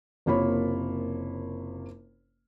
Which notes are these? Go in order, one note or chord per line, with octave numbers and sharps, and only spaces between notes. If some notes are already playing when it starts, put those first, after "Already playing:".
F#1 C3 A#3 F4 C#5 B5